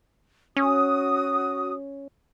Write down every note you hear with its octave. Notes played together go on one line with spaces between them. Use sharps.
C#4 F#4 D#6